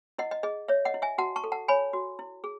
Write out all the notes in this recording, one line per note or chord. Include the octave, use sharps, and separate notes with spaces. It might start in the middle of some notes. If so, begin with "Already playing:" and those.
E4 D#5 F#5
D#5
G#4 D#5
C#5 E5
D#5 F#5
E4
E5 G#5
F#4 F#5 A5
A5 C#6
A4
F#5 A5
C#5 G#5 B5
F#4
E4
G#4